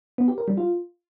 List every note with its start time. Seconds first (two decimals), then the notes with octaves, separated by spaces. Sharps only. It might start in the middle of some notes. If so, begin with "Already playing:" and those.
0.18 B3
0.28 G4
0.38 A#4
0.48 G3
0.57 F4